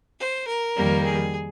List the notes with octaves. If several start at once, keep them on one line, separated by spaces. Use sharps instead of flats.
C5
A#4
F2 D#3 G3 A#3
G#4